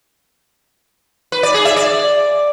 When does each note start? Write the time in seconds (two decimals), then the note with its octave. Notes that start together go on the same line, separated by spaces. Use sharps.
1.32 B4
1.43 D5
1.54 G#4
1.65 E5
1.76 D5